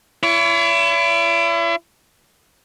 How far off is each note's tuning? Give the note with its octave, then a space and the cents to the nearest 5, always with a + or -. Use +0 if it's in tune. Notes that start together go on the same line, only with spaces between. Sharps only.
E4 +35 C#5 +45